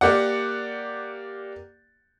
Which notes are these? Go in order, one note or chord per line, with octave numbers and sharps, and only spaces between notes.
A#3 G4 D5 F#5